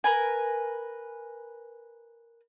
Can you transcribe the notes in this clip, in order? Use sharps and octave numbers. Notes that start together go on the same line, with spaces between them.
A#4 B4 G#5